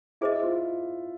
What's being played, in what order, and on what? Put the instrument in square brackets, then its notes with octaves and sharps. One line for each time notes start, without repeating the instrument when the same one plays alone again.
[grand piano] E4 [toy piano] G#4 C5 D#5
[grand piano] F4